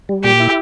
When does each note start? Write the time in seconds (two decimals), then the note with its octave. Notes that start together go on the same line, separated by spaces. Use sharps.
0.09 G3
0.24 A#2 G4
0.40 E4